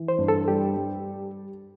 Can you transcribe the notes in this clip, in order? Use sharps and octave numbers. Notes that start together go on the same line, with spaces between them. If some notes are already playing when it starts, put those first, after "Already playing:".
Already playing: E3
C5
G2
A4
G3 G4
G3